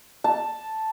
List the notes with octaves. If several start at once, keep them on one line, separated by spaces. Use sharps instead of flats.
A5